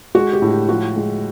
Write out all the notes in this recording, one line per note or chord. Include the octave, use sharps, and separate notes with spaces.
G#3 F#4
G4
A2
G4
F3 F#4
G#3